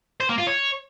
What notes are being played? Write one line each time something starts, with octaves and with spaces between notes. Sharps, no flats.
C5
A#3
F4
C#5